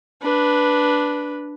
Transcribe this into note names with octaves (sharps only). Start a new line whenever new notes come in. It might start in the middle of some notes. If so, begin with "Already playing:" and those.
D4 B4